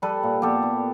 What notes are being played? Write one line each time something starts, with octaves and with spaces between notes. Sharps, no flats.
G3 A4 B4
A#2
B3 G4 A4
E4